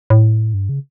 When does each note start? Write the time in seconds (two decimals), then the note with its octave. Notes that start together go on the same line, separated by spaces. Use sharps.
0.10 A2
0.54 G2
0.69 C#3